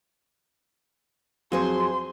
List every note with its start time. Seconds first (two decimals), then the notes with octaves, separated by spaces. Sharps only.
1.52 F2 F#3 G#4 C5 C6